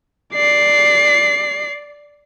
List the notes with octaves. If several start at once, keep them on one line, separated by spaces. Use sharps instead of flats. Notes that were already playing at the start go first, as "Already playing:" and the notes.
D5 C7